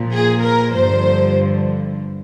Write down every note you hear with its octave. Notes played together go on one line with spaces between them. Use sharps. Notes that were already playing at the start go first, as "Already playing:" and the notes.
Already playing: A#2 F3
G#4
A#4
G2 D3 F3 C5